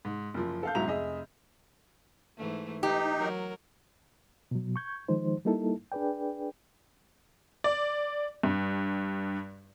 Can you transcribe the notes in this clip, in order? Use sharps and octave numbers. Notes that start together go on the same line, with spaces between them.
G#2
F#1 F3
A4 F5 G6
B1 G#2 F#3 E4 A#5 F7
F1 G#4 D#5 E5
G#2 E3 A3
E3 D#4 G4
F#3 A#4
B2 F#3
C#6 G6 G#6
D#3 F3 G#3 D#4 C5
G3 A#3 D#4 E4 A4
D4 G#4 B4 D5 G5
D5
G2